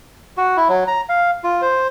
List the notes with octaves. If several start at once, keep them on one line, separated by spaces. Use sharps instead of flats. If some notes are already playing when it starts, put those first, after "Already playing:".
F#4
E4
F#3
A#5
F5
F4
C5